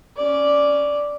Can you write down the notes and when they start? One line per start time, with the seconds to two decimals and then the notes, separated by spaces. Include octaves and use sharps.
0.17 C#4 D5